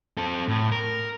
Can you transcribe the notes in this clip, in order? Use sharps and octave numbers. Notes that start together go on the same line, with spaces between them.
C4 A4
A2
A#4